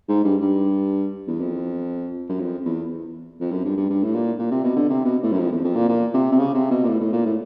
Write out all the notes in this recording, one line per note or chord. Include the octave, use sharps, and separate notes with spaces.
G#2
G2
G2
E2
F2
F#2
F2
E2
F2
F#2
G2
G2
G2
A2
A#2
A#2
C3
B2
D3
C3
B2
A2
F#2
F2
E2
F2
A#2
A#2
C3
C3
C#3
C3
B2
A#2
A2
A2
A#2
A2